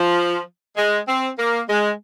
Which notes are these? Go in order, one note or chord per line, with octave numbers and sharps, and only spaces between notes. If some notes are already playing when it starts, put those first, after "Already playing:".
Already playing: F3
G#3
C4
A#3
G#3